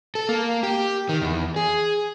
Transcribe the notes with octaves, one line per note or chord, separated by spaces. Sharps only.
A4
A#3
G4
D#3
E2
G#4